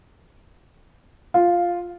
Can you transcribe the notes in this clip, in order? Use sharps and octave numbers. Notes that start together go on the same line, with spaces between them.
F4